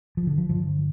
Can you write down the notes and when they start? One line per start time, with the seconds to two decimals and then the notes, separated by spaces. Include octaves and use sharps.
0.17 F3
0.27 D3
0.38 F3
0.49 G2 D3 F3